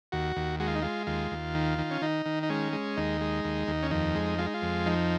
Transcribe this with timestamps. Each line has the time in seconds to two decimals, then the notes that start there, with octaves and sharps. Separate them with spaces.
0.12 D#2 F#4
0.36 D#2
0.60 G#3 F#4
0.68 F4
0.75 D#4
0.82 G#3 F4
1.07 D#2 F4
1.32 D#2
1.55 D#3
1.78 D#3
1.91 C#4
2.02 D#3 D#4
2.26 D#3
2.43 D#4
2.50 G#3 C#4
2.73 G#3
2.97 D#2 D#4
3.21 G#3
3.44 D#2
3.67 D#2
3.83 C#4
3.91 F2 D#4
4.15 G#3
4.39 G#3 F4
4.46 D#4
4.54 F4
4.62 F2
4.86 F3 D#4